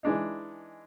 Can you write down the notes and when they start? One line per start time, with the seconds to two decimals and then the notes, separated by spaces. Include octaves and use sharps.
0.03 E3 G#3 D4 D#4